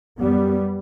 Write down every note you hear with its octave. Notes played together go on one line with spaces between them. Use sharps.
F#2 G3 B3